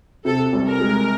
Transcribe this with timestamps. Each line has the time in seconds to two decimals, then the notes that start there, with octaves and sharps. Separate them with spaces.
0.25 C3 A4
0.53 C2
0.67 A#4
0.80 G#3